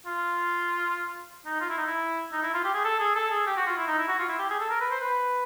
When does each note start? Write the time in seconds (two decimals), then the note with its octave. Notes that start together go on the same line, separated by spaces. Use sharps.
0.06 F4
1.46 D#4
1.61 F4
1.70 E4
1.78 D#4
1.86 E4
2.33 D#4
2.43 E4
2.54 F4
2.64 G4
2.74 G#4
2.85 A4
3.00 G#4
3.16 A4
3.31 G#4
3.47 G4
3.57 F#4
3.67 F4
3.77 E4
3.88 D#4
3.98 E4
4.08 F#4
4.19 F4
4.29 E4
4.39 G4
4.50 G#4
4.60 A4
4.70 A#4
4.80 B4
4.91 C5
5.01 B4